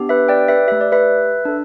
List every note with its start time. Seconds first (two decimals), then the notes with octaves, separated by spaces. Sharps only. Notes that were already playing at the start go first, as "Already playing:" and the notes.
Already playing: B3 D4 G4
0.09 B4 E5
0.28 D5 G5
0.48 B4 E5
0.68 A3 G4 E5
0.81 D5
0.92 B4 E5
1.45 D4 A4